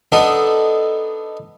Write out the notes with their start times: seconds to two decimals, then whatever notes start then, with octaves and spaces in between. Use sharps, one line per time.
0.12 B3 D4 D#4 A4